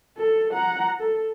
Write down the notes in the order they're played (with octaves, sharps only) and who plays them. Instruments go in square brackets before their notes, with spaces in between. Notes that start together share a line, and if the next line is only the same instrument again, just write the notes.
[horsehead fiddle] A4
F#5 A#5
A4